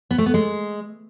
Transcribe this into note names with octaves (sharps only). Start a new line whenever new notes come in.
B3
A3
B3
G#3